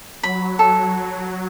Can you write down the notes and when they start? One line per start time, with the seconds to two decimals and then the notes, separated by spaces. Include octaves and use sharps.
0.23 F#3 B5
0.59 A4